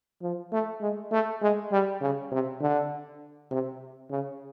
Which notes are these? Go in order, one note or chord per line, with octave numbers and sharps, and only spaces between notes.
F3
A3
G#3
A3
G#3
G3
C#3
C3
D3
C3
C#3